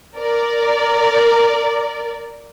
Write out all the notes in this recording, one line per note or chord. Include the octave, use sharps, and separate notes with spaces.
A#4 D5